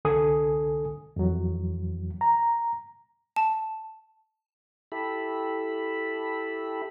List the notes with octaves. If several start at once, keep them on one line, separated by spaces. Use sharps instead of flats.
C2 D3 A4 G#5 D#6
F2 E3 F#3
A#5
A5
E4 G4 A4 E5 B5